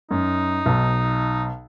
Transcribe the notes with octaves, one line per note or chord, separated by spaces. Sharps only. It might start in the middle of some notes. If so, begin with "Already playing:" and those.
F#2 D#4
B1